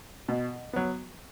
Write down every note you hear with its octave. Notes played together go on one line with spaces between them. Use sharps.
B2
F#3 B3